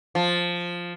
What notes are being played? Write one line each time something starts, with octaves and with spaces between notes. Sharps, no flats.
F3